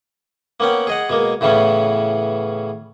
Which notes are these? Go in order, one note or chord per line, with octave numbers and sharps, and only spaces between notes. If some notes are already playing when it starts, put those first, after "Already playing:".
A#3 B3 C#4 F#5 G5
G#4 D#5 F#5
B2 G#3 A#3
A2 C#3 E3 B3 C#4